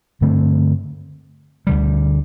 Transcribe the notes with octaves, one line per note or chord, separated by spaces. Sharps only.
G2 D3 A3 C4
D2 D3 G3